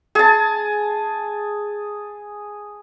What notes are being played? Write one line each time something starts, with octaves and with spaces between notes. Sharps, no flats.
G#4 A5